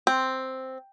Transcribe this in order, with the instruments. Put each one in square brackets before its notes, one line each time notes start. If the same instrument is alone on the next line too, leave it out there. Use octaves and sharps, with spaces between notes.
[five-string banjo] C4